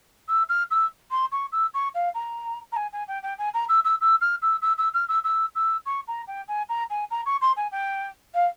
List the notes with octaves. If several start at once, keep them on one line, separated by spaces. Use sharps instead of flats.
E6
F6
E6
C6
C#6
E6
C#6
F5
A#5
A#5
G#5
G#5
G5
G5
G#5
A#5
E6
E6
E6
F6
E6
E6
E6
F6
E6
E6
E6
C#6
A#5
G5
G#5
A#5
G#5
A#5
C#6
C6
G#5
G5
F5